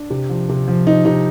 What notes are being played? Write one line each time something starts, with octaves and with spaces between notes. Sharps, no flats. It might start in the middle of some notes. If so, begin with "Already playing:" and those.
Already playing: D4
C3
F3
C3
F3
F3 D#4
C3 D#4